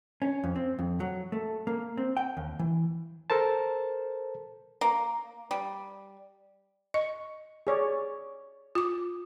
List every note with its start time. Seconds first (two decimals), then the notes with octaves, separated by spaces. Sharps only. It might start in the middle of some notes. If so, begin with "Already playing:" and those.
0.22 C#4
0.43 F2
0.56 C4
0.79 F2
1.00 F#3
1.32 A3
1.67 A#3
1.97 C4
2.17 G5
2.37 D#2
2.59 E3
3.30 A4 A#4 C5 A5
4.81 A#3
5.51 G3
6.94 D#5 C#6
7.67 G#4 C#5 D5
8.75 F4 D6